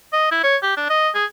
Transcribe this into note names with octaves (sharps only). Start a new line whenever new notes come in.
D#5
E4
C#5
G4
D4
D#5
G#4